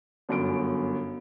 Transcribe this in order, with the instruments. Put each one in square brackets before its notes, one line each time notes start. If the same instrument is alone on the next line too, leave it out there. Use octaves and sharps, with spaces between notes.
[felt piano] G1 F#2 D7